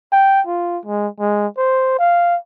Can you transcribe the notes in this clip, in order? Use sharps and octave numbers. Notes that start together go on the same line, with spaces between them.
G5
F4
G#3
G#3
C5
F5